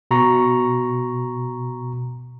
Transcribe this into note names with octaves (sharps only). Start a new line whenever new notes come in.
B2 A#5 C#6